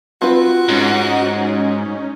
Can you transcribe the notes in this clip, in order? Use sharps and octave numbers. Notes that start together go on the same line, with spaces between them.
C4 F4 F#4 B4
G#2 C#4 D#4